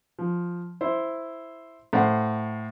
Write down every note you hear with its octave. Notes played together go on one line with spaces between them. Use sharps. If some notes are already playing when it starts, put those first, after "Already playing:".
F3
E4 C5
A2 C5 F#5